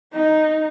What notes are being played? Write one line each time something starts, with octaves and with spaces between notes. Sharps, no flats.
D#4